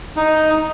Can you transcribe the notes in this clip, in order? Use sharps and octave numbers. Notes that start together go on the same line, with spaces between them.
D#4